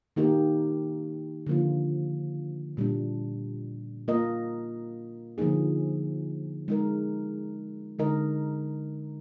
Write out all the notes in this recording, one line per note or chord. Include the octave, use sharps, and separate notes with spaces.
D#3 A#3 D#4 G4 A#4
D3 F3 A#3 F4
A#2 G3 D4
A#3 F4 A#4 D#5
D3 F3 A#3 D#4 G#4
G#3 D#4 A#4
D3 G#3 D#4 A#4 D#5